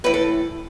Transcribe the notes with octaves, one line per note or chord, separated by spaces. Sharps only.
A2 E3 B4
A4